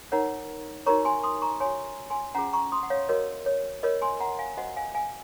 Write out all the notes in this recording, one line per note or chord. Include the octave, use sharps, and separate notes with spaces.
D#4 A#4 C#5 F#5 A#5
D#4 F#4 A#4 C#5 A#5 C#6
G#5 C6
C6 D#6
A#5 C#6
F#4 C#5 G#5 C6
G#5 C6
C#4 F4 G#4 F#5 A#5
A#5 C#6
C6 D#6
F#5
C#5 F5
F#4 A#4 C#5 D#5
C#5
F4 A#4 C#5 D#5
G#5 C6
F#5 A#5
F5 G#5
F#4 C5 D#5 F#5
F5 G#5
F5 G#5